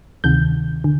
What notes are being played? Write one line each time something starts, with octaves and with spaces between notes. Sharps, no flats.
D2 C3 D#3 G6
D3